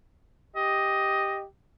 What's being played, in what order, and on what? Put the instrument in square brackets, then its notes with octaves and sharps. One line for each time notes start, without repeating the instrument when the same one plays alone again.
[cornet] G4 [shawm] D#5